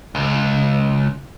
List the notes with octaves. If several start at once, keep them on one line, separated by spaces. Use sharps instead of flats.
C#2